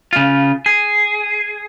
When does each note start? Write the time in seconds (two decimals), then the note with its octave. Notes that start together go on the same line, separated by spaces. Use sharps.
0.13 C#3 F4
0.66 G#4